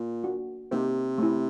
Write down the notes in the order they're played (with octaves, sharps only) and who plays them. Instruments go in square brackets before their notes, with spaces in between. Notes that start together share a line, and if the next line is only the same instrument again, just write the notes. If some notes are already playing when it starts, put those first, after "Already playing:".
Already playing: [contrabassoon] A#2
[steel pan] A#3 D4 F#4
[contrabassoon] C3 [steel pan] A#3 D#4 G4 C5
[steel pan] A3 C#4 E4